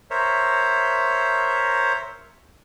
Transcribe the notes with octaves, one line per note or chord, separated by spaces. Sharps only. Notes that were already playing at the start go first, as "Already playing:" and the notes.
A#4 C5 C#5 E5